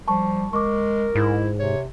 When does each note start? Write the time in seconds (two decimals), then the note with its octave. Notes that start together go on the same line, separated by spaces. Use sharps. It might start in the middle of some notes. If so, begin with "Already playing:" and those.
0.08 F3 G3 A5 C#6
0.53 G#3 A#4 C#6 D6
1.15 G#2 E4
1.60 C3 C#5